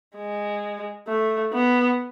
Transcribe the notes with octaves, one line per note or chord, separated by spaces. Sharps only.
G#3
A3
B3